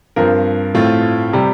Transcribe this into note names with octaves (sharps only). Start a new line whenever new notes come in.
G2 F3 C4 A#4
A2 A3 C4 F4
C3 G3